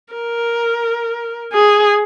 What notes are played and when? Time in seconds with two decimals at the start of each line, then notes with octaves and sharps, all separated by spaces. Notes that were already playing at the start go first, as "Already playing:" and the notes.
0.14 A#4
1.53 G#4